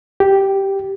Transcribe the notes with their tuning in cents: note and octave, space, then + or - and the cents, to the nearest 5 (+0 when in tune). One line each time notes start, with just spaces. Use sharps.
G4 -5